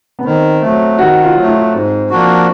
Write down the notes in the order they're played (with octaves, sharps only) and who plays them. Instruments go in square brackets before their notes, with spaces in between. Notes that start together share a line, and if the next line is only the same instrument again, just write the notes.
[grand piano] B3
[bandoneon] D#3 [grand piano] C4
[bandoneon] F#3 A3
[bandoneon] D#3 [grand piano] F#4
[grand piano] F4
[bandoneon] F#3 A3
[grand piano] F4
[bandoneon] G#2 [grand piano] C4
[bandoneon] F3 A#3 D4 F#4